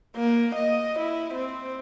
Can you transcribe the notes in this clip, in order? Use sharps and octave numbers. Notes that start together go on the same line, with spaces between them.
A#3
D#5
E4
C4